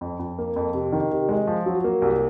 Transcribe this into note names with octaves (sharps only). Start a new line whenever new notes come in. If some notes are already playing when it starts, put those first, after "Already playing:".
F2
F2
A#3
F2
C3
D#3
C3
G#3
F3
F#3
A#3
C2